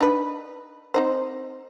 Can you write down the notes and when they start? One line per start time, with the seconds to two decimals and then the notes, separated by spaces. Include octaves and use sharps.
0.01 D4 D#4 B4
0.94 C4 D#4 C5